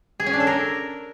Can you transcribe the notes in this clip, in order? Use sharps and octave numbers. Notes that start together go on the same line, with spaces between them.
G#4
C#4
D4
A4
A#4